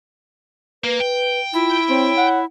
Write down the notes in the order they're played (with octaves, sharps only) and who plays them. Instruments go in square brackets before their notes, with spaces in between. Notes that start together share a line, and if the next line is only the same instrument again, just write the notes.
[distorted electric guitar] A#3 [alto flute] B4
[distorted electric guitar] G5
[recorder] E4 [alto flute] F4
[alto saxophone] C4 [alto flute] C#5
[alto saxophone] F#5